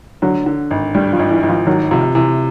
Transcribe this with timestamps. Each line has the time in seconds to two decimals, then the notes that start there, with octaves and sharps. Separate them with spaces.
0.22 D3 F#3
0.46 D3
0.71 G#1
0.94 G2 G3
1.13 F3
1.19 G#1
1.31 E3
1.43 G#1
1.49 F3
1.66 D#3 F#3
1.91 C3 F3
2.15 C3 E3